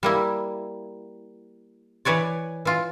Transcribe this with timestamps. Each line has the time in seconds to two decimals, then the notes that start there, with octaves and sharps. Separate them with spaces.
0.03 G3 A#3 E4
2.05 E3 B4 C#5 D5
2.65 E3 F4